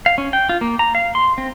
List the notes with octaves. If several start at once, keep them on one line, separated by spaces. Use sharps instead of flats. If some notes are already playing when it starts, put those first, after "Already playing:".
F5
C#4
G5
F4
A#3
A#5
F5
C6
C4